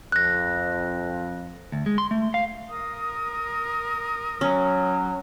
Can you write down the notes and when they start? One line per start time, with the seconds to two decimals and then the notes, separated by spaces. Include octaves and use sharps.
0.12 F2 F#6 A#6
1.72 D2
1.86 G#3
1.98 C6
2.11 A3
2.34 F5
2.68 A#4 D#6
4.41 F#3 C#4